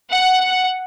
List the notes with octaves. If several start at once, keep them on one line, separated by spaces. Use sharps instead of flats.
F#5